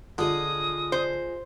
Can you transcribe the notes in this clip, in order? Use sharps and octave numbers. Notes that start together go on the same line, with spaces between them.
D3 F4 G#4 D#5 D#6
C5